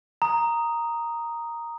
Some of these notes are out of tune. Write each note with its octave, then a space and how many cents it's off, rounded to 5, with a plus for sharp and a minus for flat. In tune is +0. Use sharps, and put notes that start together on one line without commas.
A#5 +0 D#6 +0